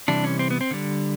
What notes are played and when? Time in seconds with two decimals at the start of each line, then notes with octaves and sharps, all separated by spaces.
0.08 C3 E3 G3 D4
0.24 C#4
0.39 C4
0.51 B3
0.61 C4
0.71 D3 G3